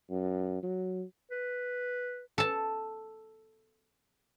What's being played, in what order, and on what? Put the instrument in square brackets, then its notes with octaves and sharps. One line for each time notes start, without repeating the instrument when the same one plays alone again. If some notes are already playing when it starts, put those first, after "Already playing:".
[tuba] F#2
F#3
[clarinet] B4
[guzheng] A4 A5